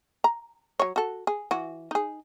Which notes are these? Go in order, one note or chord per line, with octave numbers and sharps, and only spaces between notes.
A#5
F#3 C#5
F#4 A4
G#4
E3 F#4
D#4 G#4